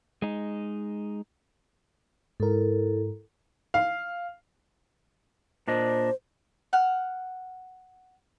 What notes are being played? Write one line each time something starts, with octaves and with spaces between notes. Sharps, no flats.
G#3 D#4
G#2 E4 A4 A#4
F5
A#2 D4 C5 D#5
F#5 F6